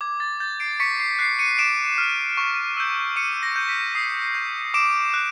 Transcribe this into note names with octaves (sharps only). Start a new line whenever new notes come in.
D6 G#6
A6
G6 A6
C7 D7
C#6 B6 C#7
C7
F#6 C7
C#7 D#7
D6 D7 E7
F6
C#6
E6 G6
D6 C#7 D#7
A#6
G6
B6
D#6 C7
G6
D6 D7 E7
F#6